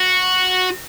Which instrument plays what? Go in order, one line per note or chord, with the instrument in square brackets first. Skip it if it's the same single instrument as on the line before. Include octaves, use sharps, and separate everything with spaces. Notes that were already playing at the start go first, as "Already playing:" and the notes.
Already playing: [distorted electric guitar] F#4